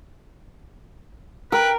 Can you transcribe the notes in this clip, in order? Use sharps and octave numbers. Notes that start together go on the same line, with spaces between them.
A#4 B4 G5